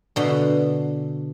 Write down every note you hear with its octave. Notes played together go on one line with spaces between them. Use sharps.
B2 D3